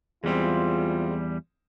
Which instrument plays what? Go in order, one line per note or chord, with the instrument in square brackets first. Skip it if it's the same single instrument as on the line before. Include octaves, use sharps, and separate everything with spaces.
[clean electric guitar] E2 G3 [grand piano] G#3 C4 [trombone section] F4